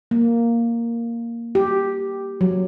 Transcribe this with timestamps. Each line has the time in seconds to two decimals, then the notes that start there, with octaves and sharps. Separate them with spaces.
0.11 A#3
1.55 G4
2.41 F#3